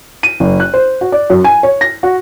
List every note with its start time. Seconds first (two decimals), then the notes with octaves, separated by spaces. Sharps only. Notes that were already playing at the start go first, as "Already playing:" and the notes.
0.23 D#7
0.40 F#1
0.60 F#6
0.74 C5
1.01 F#4
1.12 D5
1.30 F#2
1.44 G#5
1.63 C#5
1.81 A#6
2.03 F#4